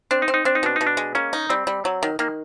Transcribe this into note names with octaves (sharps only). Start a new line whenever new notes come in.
C4 D4
D#4
C4
D#4
C4 D4
D#4
B2 D4
B2 D#4
D4
G#3
A#3 C#4
D#4
G3 C4
G3
F#3 C4
D#3
D#3 A#3